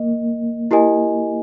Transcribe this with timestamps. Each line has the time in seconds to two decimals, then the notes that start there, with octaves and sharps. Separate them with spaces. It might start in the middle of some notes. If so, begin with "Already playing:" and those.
Already playing: A#3 D#5
0.71 E4 G4 A#4 D#5 G#5